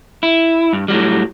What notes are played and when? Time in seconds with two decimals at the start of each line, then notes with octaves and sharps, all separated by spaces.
0.23 E4
0.73 G2
0.88 A2 F#3 G3